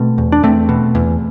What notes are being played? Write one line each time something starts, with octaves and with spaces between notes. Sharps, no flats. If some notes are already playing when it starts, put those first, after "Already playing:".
Already playing: B2 A3 C4
E2
D4
E2 A3 C4
B2
E2